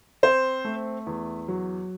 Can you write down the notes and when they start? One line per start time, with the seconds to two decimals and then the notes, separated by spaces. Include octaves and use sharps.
0.23 C4 C5
0.65 A3
1.07 E2
1.48 F#3